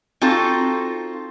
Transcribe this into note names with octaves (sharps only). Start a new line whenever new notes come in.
C4 D#4 F4 F#4 A4